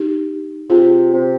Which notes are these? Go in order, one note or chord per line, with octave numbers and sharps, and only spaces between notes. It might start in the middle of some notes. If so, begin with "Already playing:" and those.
Already playing: D#4 G4
C3 F4 G#4
C3